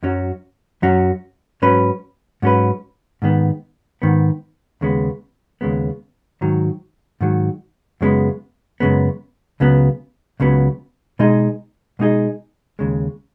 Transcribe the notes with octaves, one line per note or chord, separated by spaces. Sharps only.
F#2 F#3 C#4 F#4
F#2 F#3 C#4 F#4
G#2 F#3 C#4 B4
G#2 F#3 C#4 B4
G#2 D#3 B3
G#2 D#3 B3
D#2 C#3 G#3 B3
D#2 C#3 G#3 B3
G#2 D#3 F#3
G#2 D#3 F#3
F#2 C#3 G#3 B3
F#2 C#3 G#3 B3
C#2 C#3 F#3 B3
C#2 C#3 F#3 B3
B2 G#3 D#4 G#4 D#5
B2 G#3 D#4 G#4 D#5
D#2 C#3 G#3